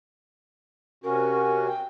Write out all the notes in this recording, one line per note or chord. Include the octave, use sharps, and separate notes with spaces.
C3 C#4 F#4 A#4
G5